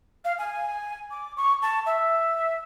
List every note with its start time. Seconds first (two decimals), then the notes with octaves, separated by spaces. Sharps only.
0.25 F5
0.39 G#5
1.11 D6
1.37 C#6
1.62 A5
1.86 E5